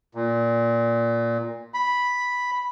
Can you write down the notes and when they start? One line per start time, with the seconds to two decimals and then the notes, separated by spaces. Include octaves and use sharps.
0.15 A#2
1.74 B5